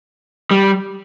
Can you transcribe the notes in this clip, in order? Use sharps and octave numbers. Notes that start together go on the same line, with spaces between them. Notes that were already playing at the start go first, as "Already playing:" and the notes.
G3